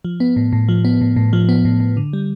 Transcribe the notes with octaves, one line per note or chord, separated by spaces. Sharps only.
F3
B3
A2
A2
F3
B3
A2
A2
F3
B3
A2
A2
D3
G3